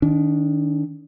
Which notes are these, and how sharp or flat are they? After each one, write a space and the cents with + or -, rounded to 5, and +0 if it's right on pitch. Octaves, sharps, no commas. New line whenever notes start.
D#3 +0 D4 -35